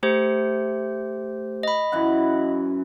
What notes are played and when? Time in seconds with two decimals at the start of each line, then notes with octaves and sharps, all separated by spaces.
0.03 A3 G4 C5
1.63 D#5 B5
1.92 F#2 E3 F#5